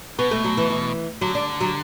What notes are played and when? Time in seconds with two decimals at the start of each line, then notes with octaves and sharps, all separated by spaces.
0.19 B2 B3
0.31 A3
0.44 F#3
0.57 E3
0.70 E3
1.21 D3 F#3
1.35 D4
1.61 F#3